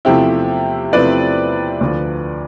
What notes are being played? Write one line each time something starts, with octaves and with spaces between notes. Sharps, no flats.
E2 C3 F3 A3 C4 E4 G4
E2 C3 F3 A3 C4 B4 D5
D2 D3 F3